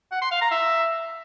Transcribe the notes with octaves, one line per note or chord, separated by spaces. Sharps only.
F#5
C6
F5
A#5
E5